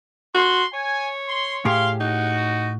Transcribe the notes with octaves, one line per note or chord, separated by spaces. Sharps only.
F#4 C6
C#5 G#5
C6
A2 G4 G#4 F5 C6
D#4 F#4